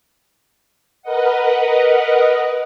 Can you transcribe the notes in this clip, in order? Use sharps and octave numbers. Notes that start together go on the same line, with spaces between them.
A#4 B4 D#5 F#5